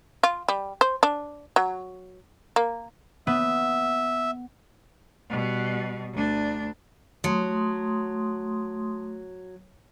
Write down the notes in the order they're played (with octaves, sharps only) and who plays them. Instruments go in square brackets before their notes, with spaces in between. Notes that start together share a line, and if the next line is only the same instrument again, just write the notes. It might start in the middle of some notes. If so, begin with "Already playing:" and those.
[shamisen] F4
G3
C5
D4
F#3
A#3
[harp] B3 [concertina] E5
[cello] B2 G3
D2 D4
[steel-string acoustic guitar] F#3 [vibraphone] A3 C6 D#6